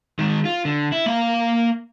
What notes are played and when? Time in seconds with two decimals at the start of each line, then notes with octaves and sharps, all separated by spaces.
0.19 D#3 G#3
0.45 F4
0.65 D3
0.92 E4
1.06 A#3 F5